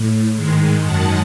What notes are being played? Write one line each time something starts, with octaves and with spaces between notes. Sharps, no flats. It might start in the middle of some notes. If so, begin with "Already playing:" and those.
Already playing: A2
G#2 D#3 G#3
F#2 D#3 G#3 F#5 A5